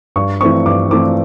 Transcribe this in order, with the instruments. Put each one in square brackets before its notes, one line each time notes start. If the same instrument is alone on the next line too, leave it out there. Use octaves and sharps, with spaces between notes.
[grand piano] G2 C#6
E3 A3 C4 C#6
G2 D6
E3 A3 C4 D6